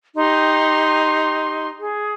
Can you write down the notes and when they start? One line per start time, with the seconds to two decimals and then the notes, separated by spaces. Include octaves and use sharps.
0.15 D#4 G4 C6
1.78 G#4